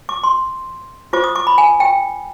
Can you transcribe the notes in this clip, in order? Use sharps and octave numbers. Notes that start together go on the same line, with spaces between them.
D6
C6
F4 C5 D6
D#6
D6
B5
G#5
G5